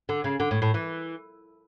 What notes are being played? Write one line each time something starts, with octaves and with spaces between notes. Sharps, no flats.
D3
C#3
D3
A2
A2
E3